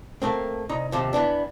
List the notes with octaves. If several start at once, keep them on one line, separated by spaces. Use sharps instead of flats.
A3 A#3 C4
C2 D#4 A#5
D#2 C3 F3
E3 B3 D4